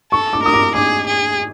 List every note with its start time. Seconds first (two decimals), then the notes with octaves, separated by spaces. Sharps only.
0.12 A4 C#6
0.33 D6
0.43 A#4 D#6
0.54 D6
0.75 G#4 D6
1.07 G#4